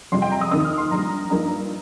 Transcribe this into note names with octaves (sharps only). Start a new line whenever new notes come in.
F2 C3 G3 C6
G5
A#5
D#6
D#2 D#3 C4 D#6
F6
C6
A#1 A#2 G3 A#5
G2 F3 A#3 D#4 A#5